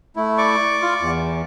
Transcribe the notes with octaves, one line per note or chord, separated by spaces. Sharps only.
A3 E4
D5 C#6 D6
F4
E2